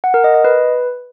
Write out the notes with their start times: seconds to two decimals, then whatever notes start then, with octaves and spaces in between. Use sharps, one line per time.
0.04 F#5
0.14 A#4
0.24 D#5
0.34 D#5
0.44 B4